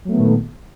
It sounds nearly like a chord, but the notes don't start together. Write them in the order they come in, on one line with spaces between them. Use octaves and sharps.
F#3 A3 B3 D#3 A#2